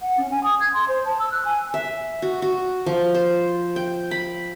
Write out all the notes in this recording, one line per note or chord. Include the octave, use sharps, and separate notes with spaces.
F#5
C#4
G#5
D#6
G#6
C6
C5
A5
E6
F#6
G#5
E5
F#4
F#4
F3
C5
G5
B5